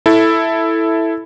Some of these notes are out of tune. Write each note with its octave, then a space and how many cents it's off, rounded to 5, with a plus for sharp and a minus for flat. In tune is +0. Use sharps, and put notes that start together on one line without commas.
E4 +0 A4 +0